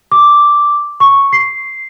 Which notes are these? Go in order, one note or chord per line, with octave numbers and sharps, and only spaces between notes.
D6
C#6
C7